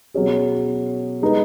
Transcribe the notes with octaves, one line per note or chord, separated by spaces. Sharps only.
B2 F#3 C#4 G#4
G#3 D#4 B4